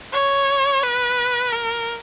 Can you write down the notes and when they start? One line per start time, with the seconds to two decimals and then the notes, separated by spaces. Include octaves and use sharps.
0.13 C#5
0.83 B4
1.53 A#4